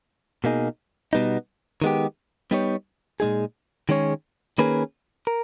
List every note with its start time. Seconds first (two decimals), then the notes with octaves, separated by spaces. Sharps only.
0.44 B2 A#3 D#4 G#4
1.13 B2 G3 B3 D#4
1.82 D#3 G#3 B3 G4
2.51 G3 B3 D#4 G4 C#5
3.20 A#2 G#3 D#4 G#4
3.89 D#3 G#3 C#4 G#4 C#5
4.58 D#3 A#3 C#4 G#4 B4
5.27 A#4